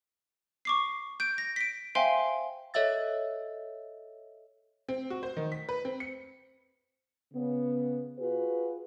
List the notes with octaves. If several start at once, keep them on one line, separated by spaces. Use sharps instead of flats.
C#6 D6 C7
G6 D7
A#6
B6 D7
C5 E5 F5 G5 G#5 C6
A4 C#5 D#5 E5 E6 A6
C4
F#4
C5
D#3
B6
B4
C4
C#7
C#3 B3
F4 F#4 G#4 B4